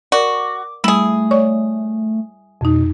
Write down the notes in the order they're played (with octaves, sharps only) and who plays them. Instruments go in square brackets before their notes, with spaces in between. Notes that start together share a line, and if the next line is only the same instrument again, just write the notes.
[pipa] F#4 [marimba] A#4 D5 [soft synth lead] D6
[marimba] G3 [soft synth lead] A3 [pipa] E4 G#4
[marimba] C#5 D5 C#6
[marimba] F2 D#4 [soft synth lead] B2